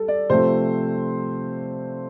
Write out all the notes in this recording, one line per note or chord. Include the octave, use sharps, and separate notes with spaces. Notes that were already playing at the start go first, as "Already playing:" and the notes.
Already playing: G3 A4
D5
C3 F3 A3 C5